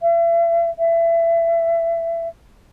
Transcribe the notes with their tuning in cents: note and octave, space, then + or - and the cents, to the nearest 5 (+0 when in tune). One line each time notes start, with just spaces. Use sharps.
E5 +40
E5 +25